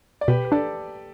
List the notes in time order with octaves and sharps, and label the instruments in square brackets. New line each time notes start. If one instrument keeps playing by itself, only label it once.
[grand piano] D5
[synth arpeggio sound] B2 [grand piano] G4 B4
[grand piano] B4
[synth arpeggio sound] D4 [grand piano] A4 D5